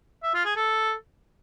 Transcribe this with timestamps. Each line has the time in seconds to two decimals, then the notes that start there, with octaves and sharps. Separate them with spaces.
0.23 E5
0.34 F4
0.45 G#4
0.56 A4